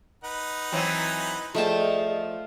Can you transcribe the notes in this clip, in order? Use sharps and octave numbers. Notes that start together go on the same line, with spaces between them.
D#4 B4 F#5
E3 F#3 C4
F3 A3 G#4 D5 D#5 G5 A5